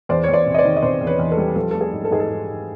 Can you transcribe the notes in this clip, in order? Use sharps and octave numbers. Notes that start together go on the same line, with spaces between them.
E2 C5 D5
E2 C#5
C5 D5
C3
D#5
C5 D5
D#3
D#5
C3 C5 D5
E2
B4 C#5
E2
A4 B4
G3
F3 A4
A3 A4
G#4
G#2
A4
G#2 G#4
A4
G#2
G#2